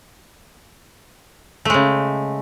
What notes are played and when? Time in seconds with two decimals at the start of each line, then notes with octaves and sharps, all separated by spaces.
1.65 A3
1.70 G#3
1.74 C#3